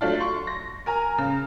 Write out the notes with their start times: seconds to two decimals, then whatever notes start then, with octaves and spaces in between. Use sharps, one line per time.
0.01 F#3 A3 D4 F4
0.20 C6 C#6
0.47 A#6
0.86 A#4 G#5 A#5
1.18 C#3